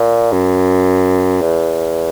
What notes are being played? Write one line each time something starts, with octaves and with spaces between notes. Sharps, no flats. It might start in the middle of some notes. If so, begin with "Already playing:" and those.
Already playing: A#2
F#2
E2